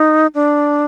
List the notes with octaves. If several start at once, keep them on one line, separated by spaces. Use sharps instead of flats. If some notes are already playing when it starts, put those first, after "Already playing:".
Already playing: D#4
D4